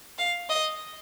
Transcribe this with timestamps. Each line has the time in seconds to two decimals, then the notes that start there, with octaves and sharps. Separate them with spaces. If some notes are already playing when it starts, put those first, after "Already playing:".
0.18 F5
0.50 D#5